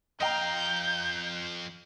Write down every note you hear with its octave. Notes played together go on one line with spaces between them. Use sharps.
F2 D#5 F5 G5 A#5 G6